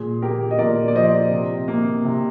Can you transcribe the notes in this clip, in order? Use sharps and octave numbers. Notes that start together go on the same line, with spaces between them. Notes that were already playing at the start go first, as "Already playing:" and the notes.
Already playing: A#2 G#4
A#3 G4 A#4
D#5
A#2 A#4 D5
D5
F3 C5 D#5
C3
A#3
C3